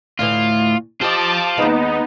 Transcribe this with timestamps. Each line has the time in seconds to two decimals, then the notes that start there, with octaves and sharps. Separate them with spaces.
0.19 D2 A2 E3 F4
1.01 F4 G4 C5 D#5 A5 D6
1.58 D#2 G#3 B3 D#4